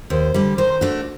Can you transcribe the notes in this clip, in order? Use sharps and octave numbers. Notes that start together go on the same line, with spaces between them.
D#2 C5
D3 G3
D#3 C5
A3 D4 F#4